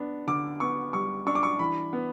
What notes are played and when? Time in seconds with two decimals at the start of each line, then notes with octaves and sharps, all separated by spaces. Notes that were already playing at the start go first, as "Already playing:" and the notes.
Already playing: B3 D4
0.27 D3 D6
0.60 B3 C#6
0.93 G3 C#6
1.27 D4 C#6
1.35 D6
1.43 C#6
1.59 E3 B5
1.93 B3